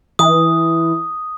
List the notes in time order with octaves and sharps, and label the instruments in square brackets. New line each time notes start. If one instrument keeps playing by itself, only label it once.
[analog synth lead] E3 [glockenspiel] D#6